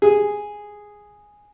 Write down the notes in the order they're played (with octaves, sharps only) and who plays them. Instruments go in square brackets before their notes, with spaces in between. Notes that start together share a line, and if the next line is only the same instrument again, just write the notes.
[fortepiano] G#4